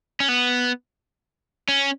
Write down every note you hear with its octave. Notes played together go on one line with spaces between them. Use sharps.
C#4
B3
C#4